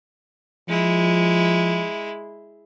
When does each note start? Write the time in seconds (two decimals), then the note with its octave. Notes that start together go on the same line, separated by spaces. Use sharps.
0.69 F3 G#3 E4